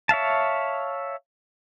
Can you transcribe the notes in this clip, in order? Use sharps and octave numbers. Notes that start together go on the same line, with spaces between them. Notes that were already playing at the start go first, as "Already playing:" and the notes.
C#5 E5 F5 A5